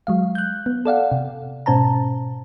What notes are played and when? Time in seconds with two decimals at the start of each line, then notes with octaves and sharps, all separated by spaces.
0.07 F#3 G#3 F5
0.35 F#6 G6
0.66 B3
0.85 A4 D5 F5 F#5
1.12 C3
1.66 G#2 B2 C#4 C5 A5 A#5